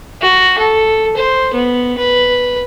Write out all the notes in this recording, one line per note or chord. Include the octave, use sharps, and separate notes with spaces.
F#4
A4
C5
B3
B4